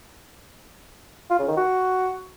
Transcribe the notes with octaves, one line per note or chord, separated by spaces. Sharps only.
F4
C#3
D#3
F#4